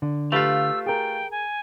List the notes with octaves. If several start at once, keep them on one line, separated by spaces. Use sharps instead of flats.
D3
A3 F4 G4 B4 F5 E6
G#4 A#4 G5
G#5